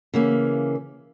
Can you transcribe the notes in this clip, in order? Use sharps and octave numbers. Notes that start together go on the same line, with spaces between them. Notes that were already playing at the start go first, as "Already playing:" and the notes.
C#3 E3 A#3